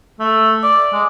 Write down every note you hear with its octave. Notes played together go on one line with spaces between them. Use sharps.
A3
D5
G#3